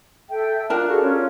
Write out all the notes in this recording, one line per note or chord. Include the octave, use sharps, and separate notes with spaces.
A4 E5 G5
D4 F4 A#4 A5 F#6
F#4 G#4 A4
C#4 F4